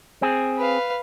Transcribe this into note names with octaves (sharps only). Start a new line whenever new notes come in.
C4 G#4
B4 F5